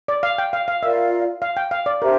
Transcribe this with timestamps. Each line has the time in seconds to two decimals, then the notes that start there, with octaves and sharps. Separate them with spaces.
0.08 D5
0.23 F5
0.38 G5
0.53 F5
0.68 F5
0.83 F4 A#4 D5 E5 F5
1.42 F5
1.57 G5
1.71 F5
1.86 D5
2.01 D4 G4 A#4 C5 E5